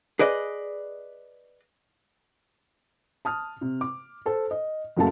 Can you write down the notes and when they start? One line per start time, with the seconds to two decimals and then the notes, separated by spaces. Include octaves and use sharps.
0.19 G#4 B4 D5 D#5
3.25 A5 D#6 F6
3.61 C3
3.81 D6
4.26 A4 C5
4.51 D#5
4.96 F#1 F#2 F#3 A3 F5 A5